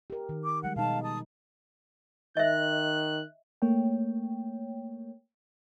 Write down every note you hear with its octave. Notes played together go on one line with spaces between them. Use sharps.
G4 A#4
D#3
D6
F3 G3 G#3 F#5
B2 D#4 F5 A5
A5 D#6
D#3 D#5 E5 F#6
A3 A#3 C#5 G5